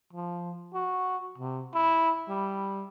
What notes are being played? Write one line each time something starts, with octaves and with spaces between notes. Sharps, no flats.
F3
F#4
C3
E4
G3